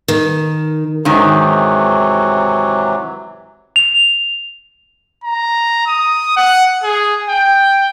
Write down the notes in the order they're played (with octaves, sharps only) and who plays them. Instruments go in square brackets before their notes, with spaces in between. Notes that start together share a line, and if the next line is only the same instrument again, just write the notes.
[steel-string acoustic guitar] D#3
[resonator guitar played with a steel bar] G#2 D#3 [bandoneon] C3 E3 F#3
[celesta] F7
[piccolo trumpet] A#5
D#6
F#5
G#4
G5